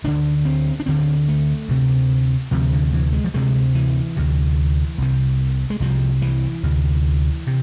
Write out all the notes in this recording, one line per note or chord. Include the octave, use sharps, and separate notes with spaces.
D2 D3 D4
C4
D4
D2 D3 C4
A3
D2 C3
D2 C3 F3
D3
E3
G#3
F3
D2 C3 G#3
E3
D2 C3
C2 C3
G#3
C2 C3 F3
E3
D2 C3
C3